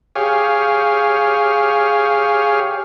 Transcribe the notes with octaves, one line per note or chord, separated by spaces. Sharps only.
G4 G#4 C#5 F5